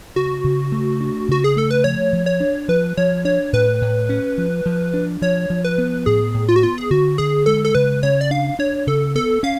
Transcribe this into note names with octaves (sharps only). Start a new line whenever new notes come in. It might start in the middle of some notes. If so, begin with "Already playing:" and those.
C#3 F#4
C#3
A3
D4
C#3 F#4
G#4
A3 A4
B4
F3 C#5
F3
C#5
D4
F3 B4
F3 C#5
D4 C#5
A2 B4
A2
C#4
F3
F3
D4
F3 C#5
F3
B4
B3
A2 G#4
A2
F4
F#4
B3 F4
G#4
D3 F#4
D3 G#4
G#3 A4
A4
C#3 B4
C#3 C#5
D5
D4 F5
D4 C#5
C#3 A4
B3 A4
C#4 F5